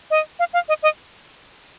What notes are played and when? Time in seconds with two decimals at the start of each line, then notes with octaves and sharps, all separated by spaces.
0.11 D#5
0.39 F5
0.53 F5
0.69 D#5
0.83 D#5